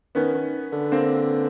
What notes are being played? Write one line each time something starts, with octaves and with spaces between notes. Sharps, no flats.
D#3 B3 C#4
D#3
D3
A#3 C4